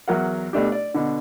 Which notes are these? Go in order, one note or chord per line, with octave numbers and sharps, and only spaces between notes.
E2 F#3 A#4 F#5
B2 A3 D4 G4
D5
B2 D3